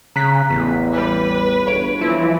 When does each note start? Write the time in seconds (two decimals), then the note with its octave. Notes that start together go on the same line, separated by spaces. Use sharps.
0.16 C#3 A#5 F#6 B6
0.50 A1 E2
0.93 E3 G3 B4
1.66 G1 C#5 D7
2.01 E3 F3 E4